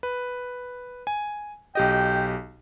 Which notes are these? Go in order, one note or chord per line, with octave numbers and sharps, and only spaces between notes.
B4
G#5
B1 G4 D#5 G5